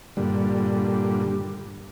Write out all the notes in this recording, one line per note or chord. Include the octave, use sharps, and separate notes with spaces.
G2 A#2 D3 G3